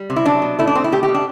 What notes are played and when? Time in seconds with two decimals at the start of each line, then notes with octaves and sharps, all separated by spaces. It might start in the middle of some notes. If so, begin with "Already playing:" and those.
Already playing: G3
0.10 C3
0.16 E4
0.26 F#3 D4
0.42 B2
0.59 A3 E4
0.67 D4
0.75 B2 C4
0.84 E4
0.92 A3 G4
1.03 G4
1.08 B2
1.14 D4